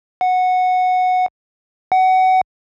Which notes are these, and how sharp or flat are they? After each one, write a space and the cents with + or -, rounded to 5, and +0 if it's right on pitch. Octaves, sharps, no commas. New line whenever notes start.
F#5 -10
F#5 +20